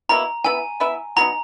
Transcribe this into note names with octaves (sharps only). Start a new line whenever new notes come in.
B2 A#3 E4 A#5
B3 E4 B4 E5 G#5
B3 E4 B4 E5
F#3 B3 D#4 A#5